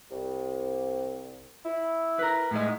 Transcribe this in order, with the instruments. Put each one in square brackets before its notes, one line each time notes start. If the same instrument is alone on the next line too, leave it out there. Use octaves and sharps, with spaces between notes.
[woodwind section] C2
E4
[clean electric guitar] A#4 B4
A2 G#3 D#5